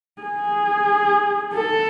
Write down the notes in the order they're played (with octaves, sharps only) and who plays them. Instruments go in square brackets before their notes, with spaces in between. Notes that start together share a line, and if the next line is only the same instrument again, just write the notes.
[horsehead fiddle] G#4
A4